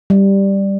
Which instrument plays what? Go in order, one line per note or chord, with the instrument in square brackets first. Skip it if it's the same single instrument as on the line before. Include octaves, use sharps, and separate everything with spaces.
[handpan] G3